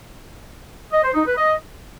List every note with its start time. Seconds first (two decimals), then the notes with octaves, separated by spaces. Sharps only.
0.92 D#5
1.03 C5
1.15 D#4
1.26 B4
1.37 D#5